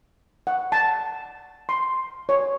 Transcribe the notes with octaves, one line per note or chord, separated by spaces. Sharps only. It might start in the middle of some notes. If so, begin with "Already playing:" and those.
F#5
A5
C6
C#5